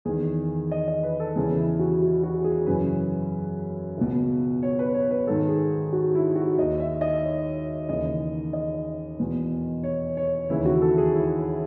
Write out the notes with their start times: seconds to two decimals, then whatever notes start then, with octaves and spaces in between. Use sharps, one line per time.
0.05 E2 D#3 G#4
0.71 D#5
0.87 D#5
1.03 B4
1.20 A4
1.36 E2 C#3 E3 G#4
1.58 E4
1.79 F#4
2.01 F#4
2.23 F#4
2.44 G#4
2.66 F#2 C#3 E3 B4
3.98 C#2 B2
4.63 C#5
4.79 B4
4.94 C#5
5.11 B4
5.27 G#2 D#3 A4
5.49 G#4
5.92 F#4
6.15 E4
6.36 F#4
6.58 D#2 D#3 D#5
6.80 E5
7.01 D#5
7.23 C#5
7.89 D#2 C#3 E3 D#5
8.53 D#5
9.19 E2 B2
9.84 C#5
10.17 C#5
10.50 D#2 C#3 E3 E4
10.66 F#4
10.82 A4
10.98 G#4
11.15 E4